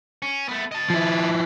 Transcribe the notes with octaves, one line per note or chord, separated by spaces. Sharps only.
C#4
A3 B3
D#5 A5
F3 E4